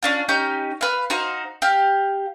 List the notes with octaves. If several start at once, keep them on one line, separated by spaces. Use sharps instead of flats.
C#4 D4 F4
C#4 D#4 G4 G6
B4 F5
D#4 F#4 C5 F5
G4 F5